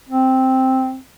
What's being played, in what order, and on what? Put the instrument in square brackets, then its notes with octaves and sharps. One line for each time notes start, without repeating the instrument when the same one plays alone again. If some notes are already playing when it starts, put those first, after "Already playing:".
[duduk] C4